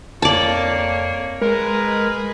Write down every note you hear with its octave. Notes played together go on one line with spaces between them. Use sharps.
F2 A#3 C#5 D5 A5
G#3 G#4 A#4 B4